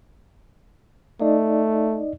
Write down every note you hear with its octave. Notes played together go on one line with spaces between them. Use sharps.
A3 D#4 D5 D#5